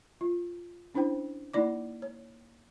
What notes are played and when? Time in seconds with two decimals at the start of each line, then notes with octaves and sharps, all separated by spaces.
0.21 F4
0.94 C#4 D4 E4 C5 G5
1.54 A#3 D#4 E4 D5 D6
2.02 C#5